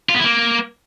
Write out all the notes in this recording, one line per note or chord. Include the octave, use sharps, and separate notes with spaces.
F4
B3
E4
A#3